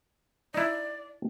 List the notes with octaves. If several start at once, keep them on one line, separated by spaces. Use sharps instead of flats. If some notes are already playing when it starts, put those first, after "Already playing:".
D#4 E4 D5